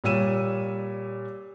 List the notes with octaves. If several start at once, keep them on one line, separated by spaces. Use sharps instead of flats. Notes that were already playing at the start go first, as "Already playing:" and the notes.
A#2 G3 C#5 E6 D#7 E7